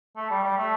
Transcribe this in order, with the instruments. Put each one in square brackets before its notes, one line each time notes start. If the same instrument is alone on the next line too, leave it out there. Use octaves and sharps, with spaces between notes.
[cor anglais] A3
G3
G3
A3